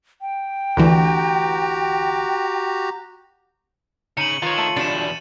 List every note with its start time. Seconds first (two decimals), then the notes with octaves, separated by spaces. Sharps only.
0.21 G5
0.77 D2 D3 E3 F#4 G4 A#5
4.17 C#3 D#4 C#7 D#7 F#7
4.42 D#3 F4 B4 C#5 A#5
4.58 A3
4.76 E2 B2 D3 G3 D4 A6 C#7 E7